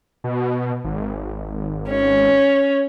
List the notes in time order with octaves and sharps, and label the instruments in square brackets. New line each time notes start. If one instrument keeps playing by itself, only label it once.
[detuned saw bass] B2
G#1
[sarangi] C#4